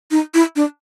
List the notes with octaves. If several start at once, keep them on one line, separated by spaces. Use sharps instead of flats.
D#4
E4
D4